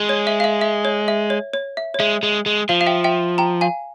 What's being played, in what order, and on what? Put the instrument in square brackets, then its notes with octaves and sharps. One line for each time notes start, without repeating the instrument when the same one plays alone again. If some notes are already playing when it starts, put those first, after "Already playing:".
Already playing: [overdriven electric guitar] G#3
[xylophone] C#5
E5
F5
E5
E5
C#5
E5
C#5
C#5
E5
C#5
[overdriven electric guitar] G#3 [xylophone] E5
[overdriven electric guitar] G#3
G#3
[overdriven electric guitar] F3 [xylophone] F5
[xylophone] F5
E5 G5
E5 G5
G5 A#5
F5 G#5